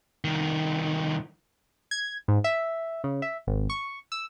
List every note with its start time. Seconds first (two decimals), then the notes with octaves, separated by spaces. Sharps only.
0.24 C2 D#3
1.91 G#6
2.28 G#2
2.44 E5
3.04 C#3
3.22 E5
3.47 G#1
3.70 C#6
4.12 E6